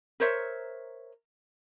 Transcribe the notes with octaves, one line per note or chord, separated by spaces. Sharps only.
A#4 C5 C#5 E5